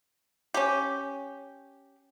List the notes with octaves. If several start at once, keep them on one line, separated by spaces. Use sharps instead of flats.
C#4 G4